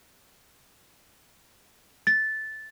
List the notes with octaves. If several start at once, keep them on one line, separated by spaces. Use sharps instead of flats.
A6